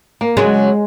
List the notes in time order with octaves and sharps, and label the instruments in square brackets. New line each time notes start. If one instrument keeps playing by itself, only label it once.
[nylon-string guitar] A#3
[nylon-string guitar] C#3 F#3 [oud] G#3